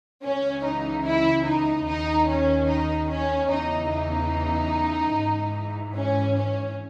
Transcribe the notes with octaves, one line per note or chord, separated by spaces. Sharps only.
C#2 C#3 E3 C#4
D#4
E4
D#4
D#2 D#3 D#4
C#4
D#4
C#4
E2 C#3 E3 D#4
D#4
G#2 E3
C#4
C#4